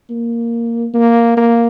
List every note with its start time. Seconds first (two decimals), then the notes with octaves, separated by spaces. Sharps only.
0.10 A#3
0.94 A#3
1.37 A#3